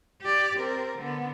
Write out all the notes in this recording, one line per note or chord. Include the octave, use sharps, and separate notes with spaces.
G4 D5
C4 A#4
D3 B3